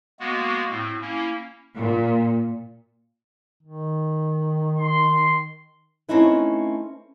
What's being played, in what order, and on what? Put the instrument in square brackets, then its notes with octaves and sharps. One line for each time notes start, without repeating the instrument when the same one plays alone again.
[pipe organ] G#3 A#3 B3 F#4
A2 C4
A#3 C#4 E4
[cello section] A#2
[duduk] D#3
[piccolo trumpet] C6
[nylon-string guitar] A3 C4 C#4 D#4 E4 B4